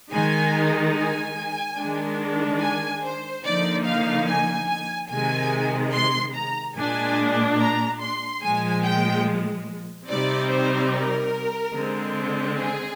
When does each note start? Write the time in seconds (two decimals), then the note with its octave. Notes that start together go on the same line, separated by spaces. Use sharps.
0.12 D#3 G#3 D#4 G#5
0.95 G#5
1.78 D#3 G#3 D4
2.61 G#5
3.03 C5
3.44 D3 F3 A#3 D#4 D5
3.85 F5
4.27 G#5
4.69 G#5
5.10 C3 D#3 G#3 G#5
5.94 C6
6.35 A#5
6.76 A#2 G#3 D4 G#5
7.59 A#5
8.01 C6
8.42 A#2 F3 G#3 G#5
8.84 G5
10.08 C3 G3 C4 D#4 D5
10.50 C5
10.92 A#4
11.75 D3 G#3 C4
12.58 G#4